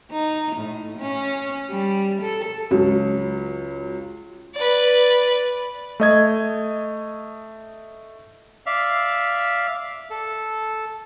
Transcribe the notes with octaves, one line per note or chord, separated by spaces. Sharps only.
D#4
A2
C#4
G3
A4
C#2 F#3 C#4
B4 D5
A3 D#5 G#6
D5 E5 F5
A4